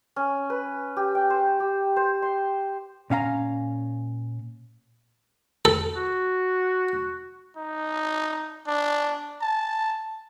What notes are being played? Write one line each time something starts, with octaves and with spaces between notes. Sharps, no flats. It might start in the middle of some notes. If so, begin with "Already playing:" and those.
C#4
B4
G4
G5
C5
G4
C5
C6
A#2 C#4 F5 A#5
A4
F#4
D#4
D4
A5